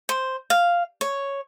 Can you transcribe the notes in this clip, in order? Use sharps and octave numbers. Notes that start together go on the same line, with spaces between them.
C5
F5
C#5